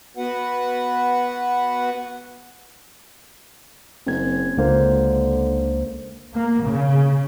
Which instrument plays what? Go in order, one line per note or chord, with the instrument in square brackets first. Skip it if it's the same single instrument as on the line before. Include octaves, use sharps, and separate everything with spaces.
[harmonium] B3 F#4 B4 F#5
[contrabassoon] F#1 [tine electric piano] C4 G#6
[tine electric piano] C#2 A#3 C5 [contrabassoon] D3
[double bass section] A#3
C#3